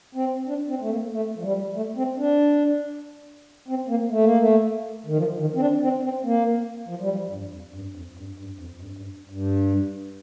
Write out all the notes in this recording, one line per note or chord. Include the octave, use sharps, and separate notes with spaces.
C4
D4
C4
A3
A#3
A3
F3
G3
A3
C4
D4
C4
A#3
A3
A#3
A3
D#3
F3
D#3
C4
D4
C4
C4
A#3
F3
G3
F3
G2
F2
G2
F2
G2
G2
F2
G2
G2
G2